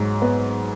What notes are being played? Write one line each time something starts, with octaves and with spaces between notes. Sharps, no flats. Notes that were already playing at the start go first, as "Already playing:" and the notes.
Already playing: G#2 F#3
B3